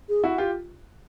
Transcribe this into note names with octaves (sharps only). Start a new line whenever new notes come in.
G#4
E4 F#4
F4 G4